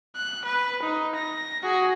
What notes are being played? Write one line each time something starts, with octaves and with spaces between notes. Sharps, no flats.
F#6
B4
D#4
A#6
F#4 G#4